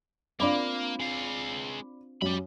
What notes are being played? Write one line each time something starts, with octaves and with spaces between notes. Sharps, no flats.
A#3 C4 D4 F4 D5 B5 D6
G#3 F5
F#2 G4 B5